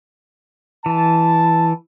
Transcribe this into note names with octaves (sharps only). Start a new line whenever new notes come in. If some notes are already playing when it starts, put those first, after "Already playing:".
E3 A5